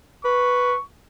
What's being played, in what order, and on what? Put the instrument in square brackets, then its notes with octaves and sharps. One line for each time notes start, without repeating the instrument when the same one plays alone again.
[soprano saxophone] B4 [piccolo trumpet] C#6